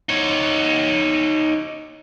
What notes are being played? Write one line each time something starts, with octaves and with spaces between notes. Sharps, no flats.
D#4 C#5